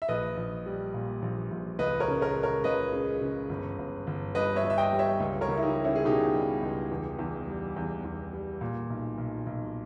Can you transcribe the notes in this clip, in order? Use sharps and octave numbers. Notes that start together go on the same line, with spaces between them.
E5
A#1 B4 D#5
A#1
G3
A#2
A#1
A#1
C#2 B4 D#5
A#4 C#5
C#3
A#4 C#5
G#3
A#4 C#5
C#2 B4 D#5
C#3
C#3
G1
G1
G1
G2 B4 D#5
C#5 E5
G2
E5
D#5 G5
G3
C#5 E5
C#2
A#4 C#5
C#2
E4
D#4 G4
G3
C#4 E4
G#4
B2 D#4 G4
G3
C#2
E2
E2
G3
E2
E2
G3
A#2
B1
B1
B1